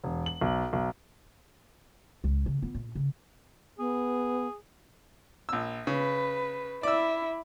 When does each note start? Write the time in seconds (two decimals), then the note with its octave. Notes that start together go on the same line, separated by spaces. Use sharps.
0.04 E1
0.26 F#7
0.41 B1
0.73 B1
2.24 C#2
2.46 C#3
2.62 B3 F4
2.75 A#2
2.95 C#3
3.79 B3 G#4
5.49 A#1 E6
5.87 C#3 B4
6.83 E4 D5 E6